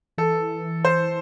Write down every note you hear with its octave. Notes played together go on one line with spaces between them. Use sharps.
E3 A4
C5